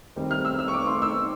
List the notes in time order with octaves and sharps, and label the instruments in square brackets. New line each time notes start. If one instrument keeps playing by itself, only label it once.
[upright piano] D#3 G3 C4
F6
E6
E6
C#6
D6
C6
E6